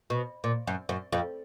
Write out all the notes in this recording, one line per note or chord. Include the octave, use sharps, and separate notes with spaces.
B2
A#2
F#2
F#2
F2